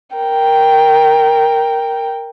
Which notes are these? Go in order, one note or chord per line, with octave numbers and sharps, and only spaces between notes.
A#4 G5